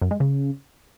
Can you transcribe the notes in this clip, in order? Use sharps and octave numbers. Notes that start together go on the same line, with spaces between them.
F#2
G#3
C#3